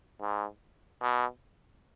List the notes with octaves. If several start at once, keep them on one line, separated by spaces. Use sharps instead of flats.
G#2
B2